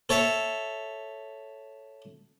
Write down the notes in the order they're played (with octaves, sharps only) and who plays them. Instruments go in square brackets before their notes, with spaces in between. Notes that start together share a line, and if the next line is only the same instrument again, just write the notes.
[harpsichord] A4 C#5 E5